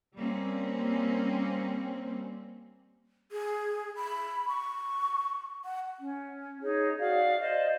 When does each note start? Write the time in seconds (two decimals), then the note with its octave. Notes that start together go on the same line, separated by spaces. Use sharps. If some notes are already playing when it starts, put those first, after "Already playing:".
0.15 G3 A#3 C4 C#4
3.32 G#4
3.96 B5
4.48 C#6
5.65 F#5
5.99 C#4
6.61 D#4 G#4 C#5
6.97 F#4 D5 F5
7.38 C5 D5 D#5